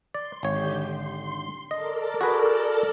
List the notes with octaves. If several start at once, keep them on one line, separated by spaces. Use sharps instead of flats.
D5 C6
G#1 D3 G4 C#5 G6
C6
A4 A#4 D5 D#5
F#4 G#4 B4